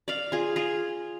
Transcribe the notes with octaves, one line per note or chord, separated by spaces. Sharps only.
D5 F5
F4 G#4
F4 G#4